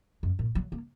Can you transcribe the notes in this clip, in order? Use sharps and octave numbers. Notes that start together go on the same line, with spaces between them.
F#2
A#2
F#3
A#3